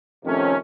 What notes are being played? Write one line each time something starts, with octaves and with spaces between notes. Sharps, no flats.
F2 C3 D#3 A3 C#4